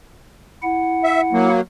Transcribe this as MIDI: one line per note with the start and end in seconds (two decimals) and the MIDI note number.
0.63 1.49 64
0.63 1.49 78
1.04 1.21 76
1.33 1.61 54
1.33 1.61 58